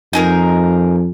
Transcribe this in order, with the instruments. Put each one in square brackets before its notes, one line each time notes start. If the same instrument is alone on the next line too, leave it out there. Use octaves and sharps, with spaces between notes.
[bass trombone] F2 [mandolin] D#4 G#4 A#4